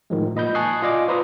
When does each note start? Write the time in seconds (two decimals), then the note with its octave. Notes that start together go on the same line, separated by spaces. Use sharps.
0.10 A2 D#3 F3 G#3
0.35 A#2 D#5 B5 G6
0.55 G#5 A5 C#6 D#6 F#6 C7
0.82 F4 D5 D#5 F5 G#5 D6
1.08 F4 B4 C5 A#5 B5 D#6